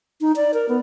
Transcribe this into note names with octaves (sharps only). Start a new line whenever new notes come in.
D#4
D5
A#4
B3